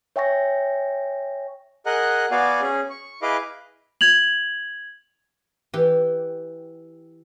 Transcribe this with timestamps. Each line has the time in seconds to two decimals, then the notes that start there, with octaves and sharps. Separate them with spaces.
0.16 C#5 E5 G5 G#5 C#6 A#6
1.86 G#4 A#4 D#5 F#5 F#6
2.31 B3 F#4 D5 F5 G#5
2.61 C#4 G#4
2.90 C#6
3.22 E4 G#4 B4 D#5 F5 D6
4.01 G#6 F7 F#7
5.74 E3 G4